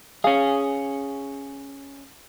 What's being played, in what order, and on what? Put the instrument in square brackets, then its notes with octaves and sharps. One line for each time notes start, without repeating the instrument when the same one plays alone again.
[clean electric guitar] C#4 G#4 [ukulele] F5